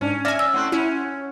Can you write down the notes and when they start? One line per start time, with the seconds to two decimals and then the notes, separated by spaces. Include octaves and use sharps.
0.01 G#2 C#4 D4
0.25 D5 E5 G#5 F6 A#6
0.39 E6
0.54 A3 C4 E4 F#5 C6 F#6
0.72 C#4 E4